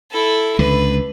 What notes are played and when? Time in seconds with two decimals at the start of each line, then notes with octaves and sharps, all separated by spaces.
0.11 E4 A4
0.59 C#2 D3 B4